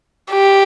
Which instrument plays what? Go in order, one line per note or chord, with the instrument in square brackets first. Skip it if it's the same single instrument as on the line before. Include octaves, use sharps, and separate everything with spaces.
[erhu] G4